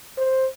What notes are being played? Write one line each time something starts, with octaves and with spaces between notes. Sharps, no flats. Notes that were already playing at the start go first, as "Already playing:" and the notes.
C5